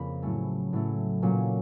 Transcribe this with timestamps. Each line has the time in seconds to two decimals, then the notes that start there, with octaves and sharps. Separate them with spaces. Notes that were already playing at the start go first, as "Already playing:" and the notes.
Already playing: F2 C#3 A#3 B5
0.22 A2 F#3 A3 C#4
0.73 A2 F#3 A3 C#4
1.22 A#2 F#3 A#3 C#4